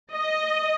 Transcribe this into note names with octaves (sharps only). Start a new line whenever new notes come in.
D#5